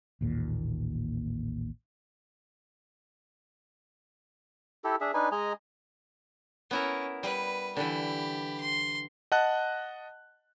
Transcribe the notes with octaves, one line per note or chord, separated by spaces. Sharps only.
A1 D#2 A#2
E4 G4 A4
D4 G#4 E5
D4 D#4 B4 G#5
G#3 D#5 G#5 A#5
B3 C#4 E4 A#4
G3 B4
D3 E3 G4 B5
C6
D#5 F#5 A5 F#6